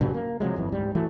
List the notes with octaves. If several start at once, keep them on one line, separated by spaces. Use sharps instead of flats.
G2 A#2 C#3 F#3
A#3
C3 F3 F#3 G#3
G1 F2 E3
D1 G#2 G3
E3 F#3 A3